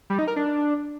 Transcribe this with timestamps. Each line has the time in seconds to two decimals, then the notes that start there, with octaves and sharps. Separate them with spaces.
0.10 G3
0.19 D#4
0.28 A#4
0.36 D4